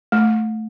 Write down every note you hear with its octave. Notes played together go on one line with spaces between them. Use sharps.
A3